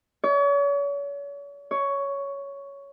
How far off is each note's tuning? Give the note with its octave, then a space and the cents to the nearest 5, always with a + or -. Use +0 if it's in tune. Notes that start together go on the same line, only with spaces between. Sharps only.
C#5 +40
C#5 +10